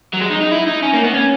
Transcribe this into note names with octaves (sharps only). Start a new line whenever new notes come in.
F#3
G#3
D#4
D#4
E4
D#4
C#4
A#3
B3
C#4